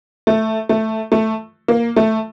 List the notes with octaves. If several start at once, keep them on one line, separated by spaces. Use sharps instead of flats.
A3
A3
A3
A#3
A3